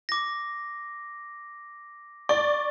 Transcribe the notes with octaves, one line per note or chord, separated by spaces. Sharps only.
D6 A#6
D5 C#6